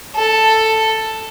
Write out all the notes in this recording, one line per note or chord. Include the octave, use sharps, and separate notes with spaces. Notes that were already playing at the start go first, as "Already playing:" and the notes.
A4